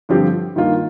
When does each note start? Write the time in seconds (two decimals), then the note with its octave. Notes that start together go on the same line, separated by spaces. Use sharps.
0.09 G2 D3 F3 C4 G4
0.56 G2 D#3 A#3 F4